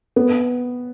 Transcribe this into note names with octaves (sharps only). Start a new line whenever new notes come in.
B3